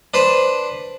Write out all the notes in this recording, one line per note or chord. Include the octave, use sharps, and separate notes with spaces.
D4 B4 C5